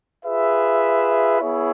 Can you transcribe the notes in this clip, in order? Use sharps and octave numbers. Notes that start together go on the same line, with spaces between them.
F4 G#4 B4 E5
B3 E4 G#4 C#5 E5